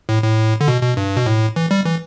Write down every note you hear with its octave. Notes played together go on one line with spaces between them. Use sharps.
A2
A2
D3
B2
B2
G2
B2
A2
E3
G3
E3